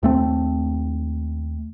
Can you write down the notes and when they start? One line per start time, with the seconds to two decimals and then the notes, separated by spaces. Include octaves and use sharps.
0.03 D#2 A3 C4